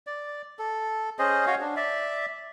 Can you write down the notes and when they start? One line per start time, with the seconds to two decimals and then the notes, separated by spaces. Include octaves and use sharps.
0.07 D5
0.59 A4
1.19 C#4 G#4 C5 D#5
1.47 F#4 C#5 D#5 F5
1.61 D4
1.76 D5 E5